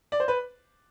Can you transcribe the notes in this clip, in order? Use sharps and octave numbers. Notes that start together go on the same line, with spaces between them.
D5
C5
B4